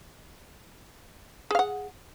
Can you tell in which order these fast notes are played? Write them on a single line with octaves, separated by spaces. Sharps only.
G#4 F5 F#5